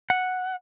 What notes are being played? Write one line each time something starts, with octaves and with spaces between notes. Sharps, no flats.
F#5